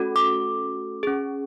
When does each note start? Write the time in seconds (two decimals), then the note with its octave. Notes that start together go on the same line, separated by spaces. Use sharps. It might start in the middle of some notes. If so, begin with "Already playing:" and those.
Already playing: A3 C#4 F#4 A4
0.16 D6
1.03 C#4 G#4